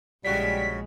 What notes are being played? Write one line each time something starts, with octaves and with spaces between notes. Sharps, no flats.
A#1 A2 C#3 G3 G#3 F#4 B6